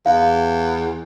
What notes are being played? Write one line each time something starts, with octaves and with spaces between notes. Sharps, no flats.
E2 F5